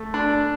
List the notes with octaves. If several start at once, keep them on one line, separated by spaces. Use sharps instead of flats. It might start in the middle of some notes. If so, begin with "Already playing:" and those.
Already playing: A3
D4